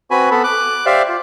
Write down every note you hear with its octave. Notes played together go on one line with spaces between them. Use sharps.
C4 F#4 B4 G#5 B5
B3 A4 B5
D6 F#6
G4 C5 D5 E5 F5
F4